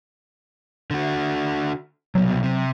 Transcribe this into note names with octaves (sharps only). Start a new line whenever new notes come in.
D3 F#4
C2 B2 F#3
C3